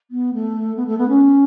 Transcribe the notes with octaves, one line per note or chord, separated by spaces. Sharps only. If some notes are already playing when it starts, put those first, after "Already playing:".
B3
A3
B3
A3
B3
C#4